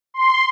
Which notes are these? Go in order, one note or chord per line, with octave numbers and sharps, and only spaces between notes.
C6